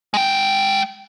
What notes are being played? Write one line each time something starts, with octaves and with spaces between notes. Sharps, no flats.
G#3 G5